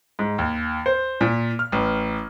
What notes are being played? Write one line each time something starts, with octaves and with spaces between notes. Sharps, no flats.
G#2
D#2
C5
A#2
F6
A1